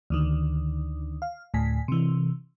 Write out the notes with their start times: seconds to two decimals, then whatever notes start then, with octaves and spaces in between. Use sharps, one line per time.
0.10 D2 D3 D#3
1.22 F5
1.54 D2 A2 G#5 B6
1.88 C3 E3